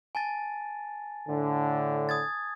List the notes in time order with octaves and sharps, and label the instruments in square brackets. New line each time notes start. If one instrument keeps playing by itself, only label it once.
[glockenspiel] G#5 A5 A6
[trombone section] A2 D3
[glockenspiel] D#6 G#6 A6